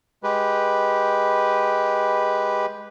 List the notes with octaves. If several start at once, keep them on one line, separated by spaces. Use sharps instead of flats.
G#3 G4 B4